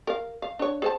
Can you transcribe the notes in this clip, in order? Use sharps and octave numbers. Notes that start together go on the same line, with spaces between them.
A#4 F5
F5
D4 C#5
G#4 C5 A5